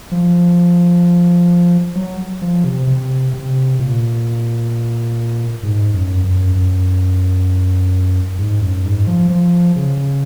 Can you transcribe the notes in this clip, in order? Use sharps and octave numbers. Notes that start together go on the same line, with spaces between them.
F3
F#3
F3
C3
C3
C3
A#2
G#2
F#2
F#2
F#2
G#2
F#2
G#2
F3
F3
C#3